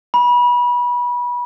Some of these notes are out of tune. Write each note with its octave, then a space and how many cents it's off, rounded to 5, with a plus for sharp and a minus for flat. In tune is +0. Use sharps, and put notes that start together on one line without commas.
B5 -25